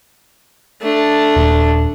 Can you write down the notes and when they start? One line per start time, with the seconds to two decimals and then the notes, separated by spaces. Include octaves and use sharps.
0.82 A3 D4
1.36 D#1